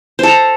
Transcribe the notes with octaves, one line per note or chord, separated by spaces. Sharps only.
A4 C5 A#5